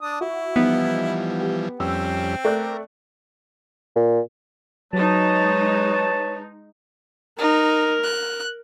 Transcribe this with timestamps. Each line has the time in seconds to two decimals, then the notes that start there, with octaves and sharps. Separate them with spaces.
0.01 D4 D#6
0.21 E4 F#4
0.56 E3 F3 G3 B3 D#4
1.40 G4
1.80 F2 G3 C4 C#4 E6
2.44 A3 A#4 D5 F#6
3.96 A#2
4.93 F#3 G#3 D#4 B4 C#5 A5
7.39 D#4 A#4
8.03 F#6